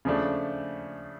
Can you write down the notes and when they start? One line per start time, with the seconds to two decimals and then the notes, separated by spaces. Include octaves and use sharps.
0.05 C#3 F3 A3 D4